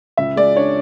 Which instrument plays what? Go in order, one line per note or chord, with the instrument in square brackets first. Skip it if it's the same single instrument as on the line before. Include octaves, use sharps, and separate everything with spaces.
[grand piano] C#2 E5
G#3 D5
D4 C#5